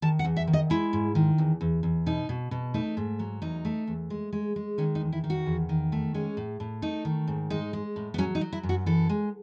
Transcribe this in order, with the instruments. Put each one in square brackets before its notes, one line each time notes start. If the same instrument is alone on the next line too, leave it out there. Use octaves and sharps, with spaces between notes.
[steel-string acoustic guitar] D#3 A5
F#5
E2
E5
D#3
D#5
G#3 E4
G#2
D#3
E2
E2
E2
B2 D#4
B2
B2
A3 D#4
G#2
F#3
E2 D#4
A3
E2
G#3
G#3
G#3
D#3 C#4
D#4
E2
E4
D#3
F#4
E2
D#3
A3
G#3 C#4
A2
A2
A3 D#4
D#3
G#2
G#3 D#4
G#3
A2
B3
F#3 C#4
D#4
F#3
E4
F#2
F#4
E3 A4
G#3